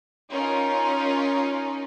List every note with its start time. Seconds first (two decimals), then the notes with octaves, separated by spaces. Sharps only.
0.30 C#4 D#4 F4 A#4